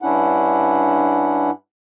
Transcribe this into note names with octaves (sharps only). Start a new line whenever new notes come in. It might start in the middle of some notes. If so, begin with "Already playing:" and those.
G2 C#4 D4 E4 F#5